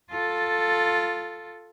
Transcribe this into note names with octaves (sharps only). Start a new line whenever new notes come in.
F4 A4